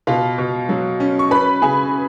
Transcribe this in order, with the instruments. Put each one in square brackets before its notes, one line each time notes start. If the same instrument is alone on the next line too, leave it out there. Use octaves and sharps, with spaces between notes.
[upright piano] B2 F4 F5
B2
F#3
C#4
C#6
C#4 B4 B5
C#3 G#4 G#5